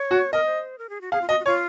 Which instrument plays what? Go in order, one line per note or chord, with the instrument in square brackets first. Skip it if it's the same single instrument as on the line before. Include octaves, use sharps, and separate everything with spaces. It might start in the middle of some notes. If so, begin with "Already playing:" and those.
Already playing: [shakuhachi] C#5
[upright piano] F#4
[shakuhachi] A#4 [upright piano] D#5
[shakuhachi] C5
A#4
G#4
F#4
[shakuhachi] G#4 [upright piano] F5
[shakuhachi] F4
[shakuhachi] F#4 [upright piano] D#5
[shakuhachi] F#4
[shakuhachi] F4 [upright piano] C#5